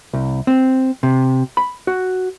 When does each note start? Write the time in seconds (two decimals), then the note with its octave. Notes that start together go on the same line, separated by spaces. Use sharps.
0.13 C2
0.47 C4
1.03 C3
1.57 B5
1.87 F#4